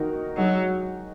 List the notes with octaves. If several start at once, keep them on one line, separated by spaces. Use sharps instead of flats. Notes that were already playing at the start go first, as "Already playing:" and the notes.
Already playing: D#3 A#3 D#4 F#4 A#4
F#3 G#3 D#4 F#4